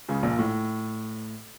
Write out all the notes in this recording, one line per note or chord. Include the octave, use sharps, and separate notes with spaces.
C#2 C#3
A#1 A#2
A2